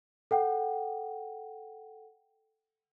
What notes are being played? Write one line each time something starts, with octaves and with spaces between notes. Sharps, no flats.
A4 F#5 G5